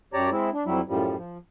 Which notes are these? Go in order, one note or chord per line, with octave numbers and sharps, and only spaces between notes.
F#2 G4 C#5 D5 A5 A#5
G#3 C4 E4
D4
F2 F#3 G3 E4
F#2 A2 F3 G3
F3